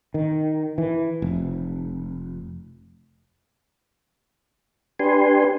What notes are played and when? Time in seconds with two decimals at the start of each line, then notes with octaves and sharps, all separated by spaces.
0.14 D#3
0.78 E3
1.22 F1
4.99 D4 G4 B4 G#5 C6